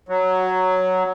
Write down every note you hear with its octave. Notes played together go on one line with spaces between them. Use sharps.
F#3